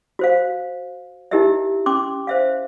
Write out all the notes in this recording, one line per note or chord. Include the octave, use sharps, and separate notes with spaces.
F#4 C5 F5
D#4 E4 G4 A#4 D#5 E5
C#4 C6 D6
C5 E5 F5